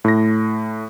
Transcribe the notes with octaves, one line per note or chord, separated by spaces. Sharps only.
A2 A#6